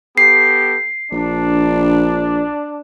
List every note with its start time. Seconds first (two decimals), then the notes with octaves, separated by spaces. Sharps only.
0.18 B3 G4 A4 C7
1.12 A#1 D4